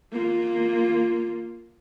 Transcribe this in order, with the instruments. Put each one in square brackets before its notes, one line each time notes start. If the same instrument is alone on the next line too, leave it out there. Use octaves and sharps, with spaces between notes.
[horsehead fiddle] A#3 F4